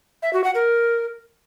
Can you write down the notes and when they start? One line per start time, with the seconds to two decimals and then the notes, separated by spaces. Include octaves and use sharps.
0.22 E5
0.33 F#4
0.44 F#5
0.55 A#4